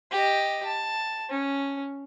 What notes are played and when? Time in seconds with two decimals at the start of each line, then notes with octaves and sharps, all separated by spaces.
0.11 G4 D#5
0.65 A5
1.30 C#4